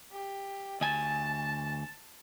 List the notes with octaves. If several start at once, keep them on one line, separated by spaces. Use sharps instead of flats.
G4
D2 G#5 A5